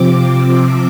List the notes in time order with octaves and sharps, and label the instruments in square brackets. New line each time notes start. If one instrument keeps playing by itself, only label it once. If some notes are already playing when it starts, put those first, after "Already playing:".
Already playing: [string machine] C3 F3 C4 D6